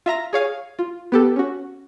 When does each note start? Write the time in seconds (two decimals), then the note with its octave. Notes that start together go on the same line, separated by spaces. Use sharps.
0.06 F4 E5 A#5 A#6
0.33 G#4 C#5 F5 G#5
0.79 F4
1.12 B3 G4 A4
1.36 C#4 F#4